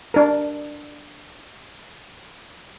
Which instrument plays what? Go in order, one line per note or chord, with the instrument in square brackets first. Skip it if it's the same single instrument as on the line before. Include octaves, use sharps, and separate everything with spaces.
[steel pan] D4 A#4